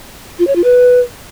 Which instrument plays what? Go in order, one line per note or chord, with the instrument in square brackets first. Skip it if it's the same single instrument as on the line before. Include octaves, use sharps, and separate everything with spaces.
[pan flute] F4
C#5
F4
B4